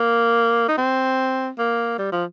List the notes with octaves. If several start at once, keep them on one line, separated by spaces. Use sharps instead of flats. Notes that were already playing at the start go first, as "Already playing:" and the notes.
Already playing: A#3
D#4
C4
A#3
G3
F3